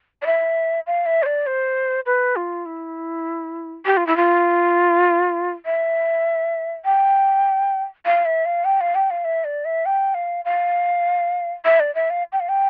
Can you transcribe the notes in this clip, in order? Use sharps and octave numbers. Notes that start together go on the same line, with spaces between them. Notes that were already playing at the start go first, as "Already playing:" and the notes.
D5
E5
F5
E5
C5
D5
C5
B4
F4
E4
G4
F4
E4
F4
E5
G5
F5
E5
F5
G5
F5
G5
F5
E5
D5
E5
G5
F5
F5
E5
D5
E5
F5
G5
F5
G5